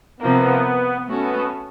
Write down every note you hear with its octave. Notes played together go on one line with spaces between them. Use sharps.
C3 F3 A#3 B3
A3 B3 C#4 F#4 A4